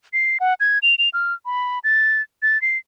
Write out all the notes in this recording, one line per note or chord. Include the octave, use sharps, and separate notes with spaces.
C7
F#5
G#6
F7
F7
F6
B5
A6
A6
C7